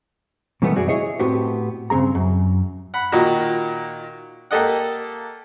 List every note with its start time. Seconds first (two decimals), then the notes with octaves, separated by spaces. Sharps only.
0.62 B2 D#3 E3 G3 A3 B3
0.76 F#2 F#4 G#4 D5
0.88 E4 G#4 C#5 D#5
1.20 A2 B3 C4 F#4 G4
1.90 G2 C#3 C4 G#4 A#5
2.15 F#2
2.94 F#5 B5
3.12 A#2 D#3 D#4 F#4 A#5
4.51 A#3 G4 A4 D#5 F#5